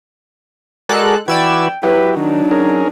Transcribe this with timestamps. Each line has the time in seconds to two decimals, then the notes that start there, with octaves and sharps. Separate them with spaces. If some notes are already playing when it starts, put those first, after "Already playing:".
0.89 G#3 F#4 A4 A#4 D5 F#6
1.28 E3 F#4 B4 D5 G5 E6 G#6
1.83 F#3 E4 G4 B4
2.16 D#3 D4 D#4
2.51 C#4 G#4 A#4